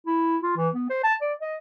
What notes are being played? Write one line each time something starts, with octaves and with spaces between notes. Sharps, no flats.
E4
F4
E3
B3
C5
A5
D5
D#5